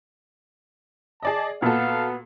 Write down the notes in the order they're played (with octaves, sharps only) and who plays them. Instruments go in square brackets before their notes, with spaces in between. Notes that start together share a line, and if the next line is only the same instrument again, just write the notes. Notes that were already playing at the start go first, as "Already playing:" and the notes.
[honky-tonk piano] G#4 D5 D#5 [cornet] A5
[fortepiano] A#2 [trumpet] B3 [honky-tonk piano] F#4 A4 [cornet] F5